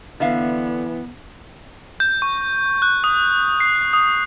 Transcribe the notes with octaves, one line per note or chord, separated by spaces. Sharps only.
D3 E3 B3 E5 F5
G6
C#6
F#6
D#6
C7
D#6